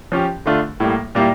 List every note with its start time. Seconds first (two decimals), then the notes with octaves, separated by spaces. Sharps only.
0.12 F3 C#4 G4
0.46 D3 A3 D4 F4
0.80 A2 G3 A#3
1.15 A#2 G3 A#3 E4 G4